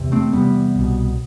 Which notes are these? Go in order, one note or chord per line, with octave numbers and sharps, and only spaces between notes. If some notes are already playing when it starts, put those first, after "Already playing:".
Already playing: E2 C3
A3 C4
E2 C3 G3 B3
C2 B2